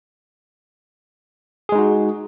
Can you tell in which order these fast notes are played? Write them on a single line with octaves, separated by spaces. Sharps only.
G#4 G#3 D#4 F#4